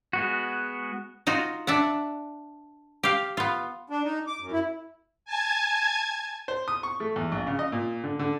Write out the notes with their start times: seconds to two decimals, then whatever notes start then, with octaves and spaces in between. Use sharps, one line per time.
0.13 G#3 B3 F#4
1.27 D#4 F4 F#4
1.67 D4 E5 F#5
3.03 G4 F5
3.37 B3 F4
3.90 D4
4.04 D#4
4.27 D6
4.40 F#2
4.52 E4
5.25 G#5 A5 G#6
6.48 C5
6.68 D#6
6.83 C#6
7.00 A3
7.16 E2
7.32 A#1
7.47 C#3
7.59 D#5
7.72 A#2
8.03 D3
8.19 D3